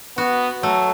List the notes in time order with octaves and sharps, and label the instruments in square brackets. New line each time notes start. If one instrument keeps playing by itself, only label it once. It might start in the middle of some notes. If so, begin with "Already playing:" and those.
[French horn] B3 [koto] F#4
[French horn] F#3 [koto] A3